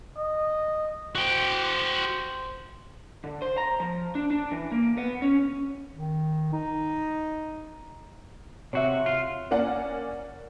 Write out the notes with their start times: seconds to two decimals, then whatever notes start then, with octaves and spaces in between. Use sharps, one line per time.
0.16 D#5
1.15 F#4 C5 G5
3.24 D3
3.42 C5
3.58 A#5
3.80 F3
4.15 D4
4.31 D4
4.52 E3
4.72 A#3
4.98 B3
5.22 C#4
5.96 D#3
6.53 D#4
8.73 C3 F#4 C#5 E5
9.06 F4
9.51 A#3 C#4 D5 F#5